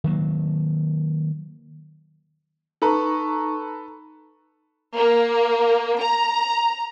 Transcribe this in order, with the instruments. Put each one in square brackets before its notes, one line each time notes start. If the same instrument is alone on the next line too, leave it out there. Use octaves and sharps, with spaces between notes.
[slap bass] D#3 F#3 A#3
[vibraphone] D#4 C#6 [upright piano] A4 B4 A#5
[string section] A#3
A#5